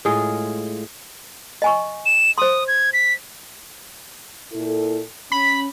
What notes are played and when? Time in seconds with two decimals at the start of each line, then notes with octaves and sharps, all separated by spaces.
0.05 A2 G#3 F4 G#4
1.62 D#5 G#5 C#6
2.06 E7
2.38 C5 C6 D#6
2.68 G#6
2.93 B6
4.52 A#2 E4 A4
5.32 C#4 B5